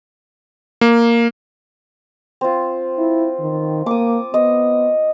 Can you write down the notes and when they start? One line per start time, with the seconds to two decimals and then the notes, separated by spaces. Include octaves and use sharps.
0.81 A#3
2.41 C4 F4
2.98 E4
3.40 D#3
3.86 A#3 D6 D#6
4.34 B3 D#5